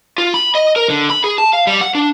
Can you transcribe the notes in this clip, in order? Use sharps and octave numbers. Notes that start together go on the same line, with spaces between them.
F4
B5
D#5
A#4
D3
B5
G#4
A5
F5
G3
F#5
D4